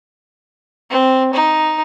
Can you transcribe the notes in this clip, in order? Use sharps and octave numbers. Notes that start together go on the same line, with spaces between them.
C4
D#4